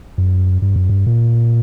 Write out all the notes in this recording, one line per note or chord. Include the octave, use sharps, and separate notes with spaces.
F#2
G2
F#2
G2
A#2